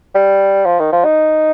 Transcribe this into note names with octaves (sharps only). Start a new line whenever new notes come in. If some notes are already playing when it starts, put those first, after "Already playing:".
G3
F3
D#3
F3
D#4